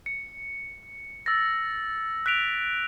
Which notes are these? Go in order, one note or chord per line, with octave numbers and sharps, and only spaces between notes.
C#7
E6 A6 A#6
F#6 B6 D7 F7